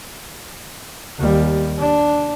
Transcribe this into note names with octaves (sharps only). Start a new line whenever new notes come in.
D#2 G3
D4